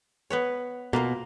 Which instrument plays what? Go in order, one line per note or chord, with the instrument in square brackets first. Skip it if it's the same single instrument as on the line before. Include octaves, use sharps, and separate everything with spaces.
[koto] B3 B4 C#5
[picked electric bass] B2 [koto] A#3 F4 A#4